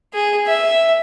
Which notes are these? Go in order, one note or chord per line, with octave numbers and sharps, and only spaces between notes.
G#4
E5